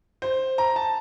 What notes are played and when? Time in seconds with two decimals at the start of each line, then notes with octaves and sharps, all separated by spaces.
0.22 C5
0.58 A#5
0.76 A5